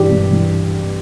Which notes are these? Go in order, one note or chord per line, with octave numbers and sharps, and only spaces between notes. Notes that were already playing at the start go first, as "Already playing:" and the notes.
Already playing: G2 E3 D4 G4
G2
E3